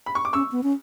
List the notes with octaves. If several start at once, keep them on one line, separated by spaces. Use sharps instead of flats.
B5
C#6
D6
C#4 C#6 E6
B3
C#4